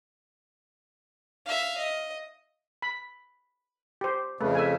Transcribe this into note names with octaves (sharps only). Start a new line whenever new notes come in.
E5 F5
D#5
B5
G4 C5
F2 C#3 A3 B4
E5 G#5